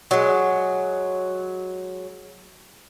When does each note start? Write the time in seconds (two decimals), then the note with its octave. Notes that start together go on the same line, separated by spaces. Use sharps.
0.11 F#3 G#3